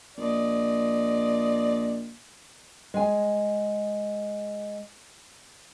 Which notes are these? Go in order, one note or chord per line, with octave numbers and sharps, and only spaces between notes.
A#1 D5 D#5
G#3 G#5